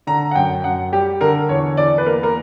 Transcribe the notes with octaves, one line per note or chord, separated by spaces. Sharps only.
D3 A#5
F#5
F#2 G5
F#2 F#5
G3 G4
D3 A#4
E2 C#5
E2 D5
B4
A#3 A#4
A#4